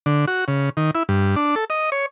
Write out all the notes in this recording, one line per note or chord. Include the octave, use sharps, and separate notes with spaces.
D3
F#4
C#3
D#3
E4
G2
D4
A4
D#5
C#5